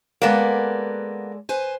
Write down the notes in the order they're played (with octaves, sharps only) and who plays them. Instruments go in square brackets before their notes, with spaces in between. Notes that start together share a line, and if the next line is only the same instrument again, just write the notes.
[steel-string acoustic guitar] G#3 A4 D5 [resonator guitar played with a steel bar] A#3 B3
[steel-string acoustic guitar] B4 C5 G#5